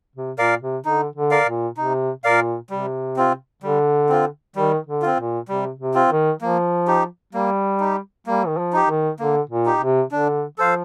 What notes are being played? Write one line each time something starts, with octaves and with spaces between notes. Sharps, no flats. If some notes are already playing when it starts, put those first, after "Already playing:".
C3
A#2 A#4 D5 F5
C3
D3 D#4
D3
A#4 D5 F5
A#2
C3 D#4
A#2 A#4 D5 F5
C3 G3
C4 F4
D3 G3
C4 F4
D#3 G3
D3
C4 F4
A#2
C3 G3
C3
C4 F4
D#3
F3 A#3
D#4 G4
G3 A#3
D#4 G4
G3 A#3
D#3
F3
D#4 G4
D#3
D3 A#3
A#2
D#4 G4
C3
D3 D4
F3 A4 C5 F5